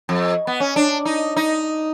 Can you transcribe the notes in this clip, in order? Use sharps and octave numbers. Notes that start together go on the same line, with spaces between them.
F2
B3
C#4
D4
D#4
D#4